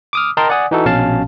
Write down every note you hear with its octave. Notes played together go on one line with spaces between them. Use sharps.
D6 D#6 F6
A#4 D#5 G5 A5 A#5 C6
D5 F#5 G#5 D#6
E3 D#4 F#4 A4
A#1 B2 C#4 F5 A5